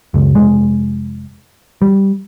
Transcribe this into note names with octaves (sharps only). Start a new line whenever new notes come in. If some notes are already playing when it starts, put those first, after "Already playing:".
F#1 C#2
F1 G#3
G3